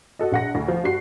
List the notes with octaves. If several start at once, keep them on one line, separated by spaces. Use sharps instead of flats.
F#4 A4 D#5
A#1 F#5 A#6
D2
F3
G2 F#4 C7